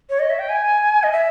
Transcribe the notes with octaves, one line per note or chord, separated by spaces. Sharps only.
C#5
D#5
E5
G5
G#5
D#5
E5